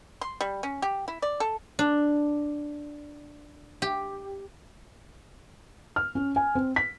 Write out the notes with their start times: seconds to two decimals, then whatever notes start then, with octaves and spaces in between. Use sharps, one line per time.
0.21 C6
0.41 G3
0.63 C#4
0.82 G4
1.08 E4
1.22 D5
1.40 A4
1.79 D4
3.82 G4
5.96 F6
6.15 C#4
6.36 G#5
6.55 C4
6.76 B6